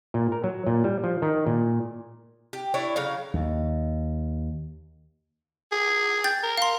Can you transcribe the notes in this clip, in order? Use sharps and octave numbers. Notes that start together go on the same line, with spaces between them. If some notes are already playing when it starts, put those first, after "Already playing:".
A#2
A#4
F#3
A#2
G3
F3
D#3
A#2
G4
D4 E4 C#5
C#3 F#3 F5
D#2
G#4
G5 G6 A6
A#4
F5 C6